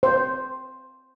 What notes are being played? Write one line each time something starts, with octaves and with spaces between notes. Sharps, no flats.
C5